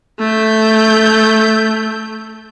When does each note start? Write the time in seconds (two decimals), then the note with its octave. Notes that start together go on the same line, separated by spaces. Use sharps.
0.19 A3 G6